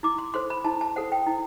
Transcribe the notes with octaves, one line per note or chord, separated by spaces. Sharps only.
E4 D6
C6
A4 C5 C6
B5
E4 A5
A5
A4 C5 F#5
G5
E4